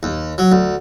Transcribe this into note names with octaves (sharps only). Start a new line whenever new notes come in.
D#2
F#3
D2